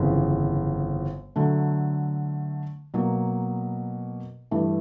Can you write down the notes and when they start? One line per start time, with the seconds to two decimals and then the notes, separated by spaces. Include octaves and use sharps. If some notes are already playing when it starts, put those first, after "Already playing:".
Already playing: G1 F2 C#3 E3
1.36 D3 F#3 A3
2.94 B2 F#3 A#3
4.51 G2 E3 A3